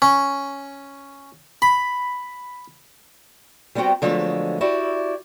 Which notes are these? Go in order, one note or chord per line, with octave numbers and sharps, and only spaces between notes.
C#4
B5
G3 B3 C4 F#4 G5
D3 F3 F#3 G#3 A3 B3
E4 F#4 G4 D5